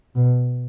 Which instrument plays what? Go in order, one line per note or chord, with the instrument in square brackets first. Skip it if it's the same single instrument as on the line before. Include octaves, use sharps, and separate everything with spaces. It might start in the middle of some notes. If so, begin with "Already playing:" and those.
[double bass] B2